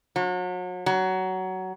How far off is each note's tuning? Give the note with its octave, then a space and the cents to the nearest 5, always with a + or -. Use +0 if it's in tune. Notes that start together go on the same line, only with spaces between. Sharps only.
F#3 -35
F#3 +15